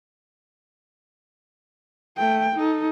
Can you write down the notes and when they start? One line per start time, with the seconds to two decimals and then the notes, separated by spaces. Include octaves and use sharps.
2.17 A3 G5
2.56 D#4 A4